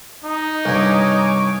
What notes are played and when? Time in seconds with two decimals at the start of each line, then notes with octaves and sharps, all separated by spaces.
0.24 D#4
0.65 C2 G2 C#5 G#5 D6